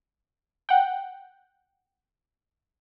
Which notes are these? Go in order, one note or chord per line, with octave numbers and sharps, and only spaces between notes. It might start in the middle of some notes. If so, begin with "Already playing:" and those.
F#5 G5